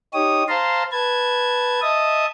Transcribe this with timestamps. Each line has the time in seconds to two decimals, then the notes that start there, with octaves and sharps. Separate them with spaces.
0.13 D#4 G4 C#5 D#6
0.48 C5 F5 A5 A#5 C6
0.92 B4 A5 G#6
1.82 D#5 E5 A5 D#6